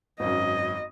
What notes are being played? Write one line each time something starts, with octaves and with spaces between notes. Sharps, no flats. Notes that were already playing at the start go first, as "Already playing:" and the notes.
G#1 F#2 D#5